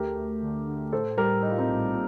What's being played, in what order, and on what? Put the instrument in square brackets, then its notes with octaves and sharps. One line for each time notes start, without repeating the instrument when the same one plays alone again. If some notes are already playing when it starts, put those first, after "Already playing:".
Already playing: [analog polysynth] D2 A3 [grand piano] G4 A#4
[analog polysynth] D2
D3
D3
[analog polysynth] A2 [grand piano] A4 C5
[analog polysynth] G3 [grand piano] G4 A#4
[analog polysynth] G3 [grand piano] D#4
[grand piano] F4
C4 D#4
[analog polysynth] A#1
A#2